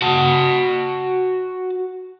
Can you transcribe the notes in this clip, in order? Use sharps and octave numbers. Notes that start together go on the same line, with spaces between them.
F#4 A5